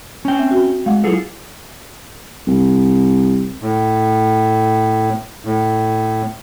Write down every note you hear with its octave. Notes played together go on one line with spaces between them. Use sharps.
C#4 G5
C4 E5
F#4
G#3 F5 F#5
F#3 E4 F4 G#4 A4
C2
A2
A2